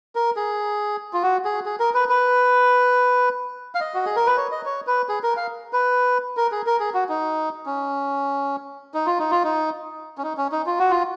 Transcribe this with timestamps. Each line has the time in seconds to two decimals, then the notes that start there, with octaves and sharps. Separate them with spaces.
0.15 A#4
0.36 G#4
1.13 F4
1.22 F#4
1.45 G#4
1.66 G#4
1.80 A#4
1.94 B4
2.09 B4
3.75 F5
3.81 D#5
3.94 F#4
4.05 G#4
4.16 A#4
4.26 B4
4.37 C#5
4.51 D#5
4.66 C#5
4.87 B4
5.09 G#4
5.23 A#4
5.37 F5
5.73 B4
6.37 A#4
6.52 G#4
6.66 A#4
6.80 G#4
6.94 F#4
7.09 D#4
7.66 C#4
8.94 D#4
9.06 F4
9.19 D#4
9.31 F4
9.44 D#4
10.18 C#4
10.23 D#4
10.37 C#4
10.52 D#4
10.66 F4
10.79 F#4
10.91 F4